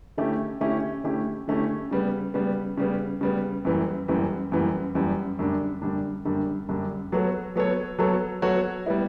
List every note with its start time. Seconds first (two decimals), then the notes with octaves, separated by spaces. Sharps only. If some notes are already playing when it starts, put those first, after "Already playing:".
0.17 D3 A3 C#4 E4 G4
0.60 D3 A3 C#4 E4 G4
1.04 D3 A3 C#4 E4 G4
1.48 D3 A3 C#4 E4 G4
1.91 C#3 G3 B3
2.34 C#3 G3 B3
2.78 C#3 G3 B3
3.21 C#3 G3 B3
3.65 F#2 E3 G3
4.08 F#2 E3 G3
4.52 F#2 E3 G3
4.95 F#2 E3 G3
5.39 F#2 D3 G3 D4
5.82 F#2 D3 G3 D4
6.25 F#2 D3 G3 D4
6.69 F#2 D3 G3 D4
7.12 F#3 B3 F#4 A4 C#5
7.56 F#3 B3 F#4 A4 C#5
7.99 F#3 B3 F#4 A4 C#5
8.42 F#3 B3 F#4 A4 C#5
8.86 G3 B3 E4